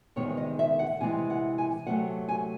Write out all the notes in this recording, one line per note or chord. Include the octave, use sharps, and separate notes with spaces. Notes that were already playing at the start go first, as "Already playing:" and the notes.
E2 C3 D#3 G#3 C#5
D#5
E5
F#5
C3 E3 G#3 G#5
F#5
G#5
C3 F#3 A3 F#5
G#5